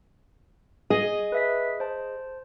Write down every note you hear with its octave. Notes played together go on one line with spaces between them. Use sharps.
G#4 D#5 G#5
B4 E5 B6
C5 A5